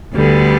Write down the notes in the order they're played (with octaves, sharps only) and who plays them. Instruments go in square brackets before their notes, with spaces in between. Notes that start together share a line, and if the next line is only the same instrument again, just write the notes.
[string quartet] D2 D3 G3 B3